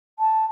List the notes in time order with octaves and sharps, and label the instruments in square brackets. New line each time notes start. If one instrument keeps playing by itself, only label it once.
[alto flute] A5